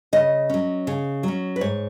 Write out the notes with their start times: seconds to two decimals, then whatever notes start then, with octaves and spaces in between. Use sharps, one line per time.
0.13 C#3 D#5
0.50 F#3 C#4
0.87 C#3
1.23 F#3 C#4
1.56 B4
1.61 G#2 C#5